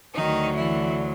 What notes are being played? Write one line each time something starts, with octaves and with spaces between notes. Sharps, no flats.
D2 D3 D#3 F#3 D#4
E3 E4